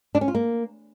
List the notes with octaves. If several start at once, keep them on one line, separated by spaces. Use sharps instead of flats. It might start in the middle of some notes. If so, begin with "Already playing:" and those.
D4
C#4
F4
A#3